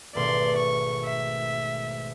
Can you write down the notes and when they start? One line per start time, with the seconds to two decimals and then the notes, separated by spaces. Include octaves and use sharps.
0.15 G#1 B2 A3 D5 C6
0.57 C#6
1.04 E5